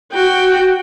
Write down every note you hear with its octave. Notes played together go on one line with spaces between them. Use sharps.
F#4 G5